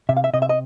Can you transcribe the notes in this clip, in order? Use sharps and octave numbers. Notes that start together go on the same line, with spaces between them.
C3 E5
F5
E5
C3 D#5
E5
D#5